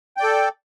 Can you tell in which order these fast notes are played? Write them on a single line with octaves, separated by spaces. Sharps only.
G5 D5 A4